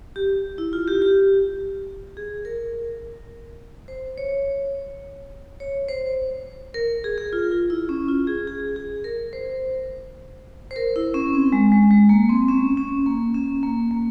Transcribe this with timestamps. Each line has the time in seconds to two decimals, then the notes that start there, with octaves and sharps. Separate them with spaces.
0.16 G4
0.58 E4
0.73 F4
0.88 G4
1.02 G4
2.17 G#4
2.45 A#4
3.88 C5
4.18 C#5
5.60 C#5
5.88 C5
6.74 A#4
7.04 G#4
7.18 G#4
7.33 F4
7.51 F4
7.70 E4
7.89 C#4
8.08 F4
8.27 G#4
8.48 G#4
8.76 G#4
9.04 A#4
9.33 C5
10.71 C5
10.76 A#4
10.96 E4
11.14 C#4
11.33 C4
11.53 G#3
11.72 G#3
11.91 G#3
12.09 A#3
12.30 C4
12.48 C#4
12.77 C#4
13.06 A#3
13.34 C#4
13.63 A#3
13.91 A#3